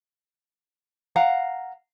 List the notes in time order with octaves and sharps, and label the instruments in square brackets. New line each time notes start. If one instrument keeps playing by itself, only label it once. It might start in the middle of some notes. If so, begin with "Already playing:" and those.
[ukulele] F5 F#5 A#5